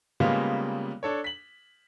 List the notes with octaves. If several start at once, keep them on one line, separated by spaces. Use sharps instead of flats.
C#3 G3 G#3 A#3 B3 F4
D4 A4 C#5
B6 F#7